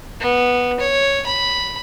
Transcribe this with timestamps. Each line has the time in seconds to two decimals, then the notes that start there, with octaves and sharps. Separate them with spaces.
0.20 B3
0.80 C#5
1.26 B5